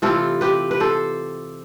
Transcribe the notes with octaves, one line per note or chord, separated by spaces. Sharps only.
C3 E3 A3 C4 F4 A4
G4 B4
B4
A4 C5